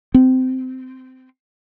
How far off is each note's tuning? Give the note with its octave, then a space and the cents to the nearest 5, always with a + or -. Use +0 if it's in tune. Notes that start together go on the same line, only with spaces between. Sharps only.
C4 -20